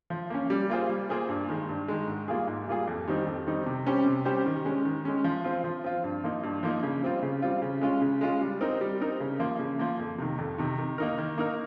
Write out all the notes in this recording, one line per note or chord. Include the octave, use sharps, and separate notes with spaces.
F3
A#3 C#4
G3
A#3 F4 G#4 C5
G3
A#3 F4 G#4 C5
G2
D#3 G#3
G2
D#3 G#3
G#2
G3 A#3 F4 G#4
G#2
G3 A#3 F4 G#4
F2
D#3 G3 C4 D#4
F2
D#3 G3 C4 D#4
C3
G3 C#4 G4 C5
C3
G3 C#4 G4 C5
D#3
G#3 C#4
D#3
G#3 C#4
F3
C4 F4
F3
C4 F4
G2
F3 A#3 D#4
G2
F3 A#3 D#4
C#3
G3 C4 F4
C#3
G3 C4 F4
C#3
G#3 C#4 F4
C#3
G#3 C#4 F4
G3
C4 D#4 A#4
G3
C4 D#4 A#4
C#3
F3 A#3
C#3
F3 A#3
F2
C3 D#3
F2
C3 D#3
D#3
A#3 D#4 A#4
D#3
A#3 D#4 A#4